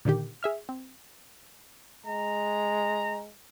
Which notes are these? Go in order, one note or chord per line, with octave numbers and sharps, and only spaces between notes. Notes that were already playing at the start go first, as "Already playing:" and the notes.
A#2 D3 D#3 G4
G#4 E5 F6
C4
G#3 A#5